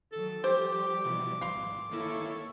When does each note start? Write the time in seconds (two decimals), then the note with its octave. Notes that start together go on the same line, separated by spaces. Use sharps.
0.12 D#3 F#3 A4
0.44 F3 G3 G4 C5 D6
1.05 B2 E3
1.41 G#1 F5 C6
1.91 D#3 A#3 E4 A4 C#5